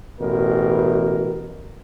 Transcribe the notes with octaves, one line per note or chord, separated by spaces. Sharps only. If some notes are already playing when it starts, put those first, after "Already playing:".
A1 B2 A#4